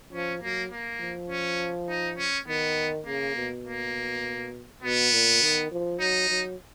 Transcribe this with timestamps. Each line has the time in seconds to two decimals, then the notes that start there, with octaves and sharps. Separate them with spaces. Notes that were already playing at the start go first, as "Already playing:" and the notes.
0.12 F3 C#4
0.42 F#3 A#3
0.72 A#3
1.00 F3
1.30 C#4
1.89 D#4
2.18 C#4
2.47 D#3 B3
3.06 C#3 A#3
3.36 B2
3.66 A#3
4.82 B2 B3
5.13 A#2
5.42 D#3
5.72 F3
6.00 F#3 D#4
6.29 F#3